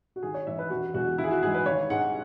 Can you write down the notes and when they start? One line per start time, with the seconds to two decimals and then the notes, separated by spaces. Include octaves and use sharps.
0.16 F#4
0.23 G#1 G#4
0.34 C#5
0.47 G#2 E3 E5
0.59 B4
0.70 E1 F#4
0.94 E2 B2 G#3 F#4
1.18 G#1 E4
1.24 G#4
1.31 F#4
1.42 G#2 E3 G#3 G#4
1.54 B4
1.66 G#1 C#5
1.90 G#2 G#3 F#5